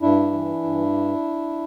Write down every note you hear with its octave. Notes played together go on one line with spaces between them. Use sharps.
G2 D4 E4
E3
G2